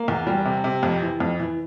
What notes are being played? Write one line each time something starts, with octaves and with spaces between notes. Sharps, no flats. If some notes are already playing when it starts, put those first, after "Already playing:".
Already playing: A#3
E2
G3
C3
C3
F2
E3
F2
E3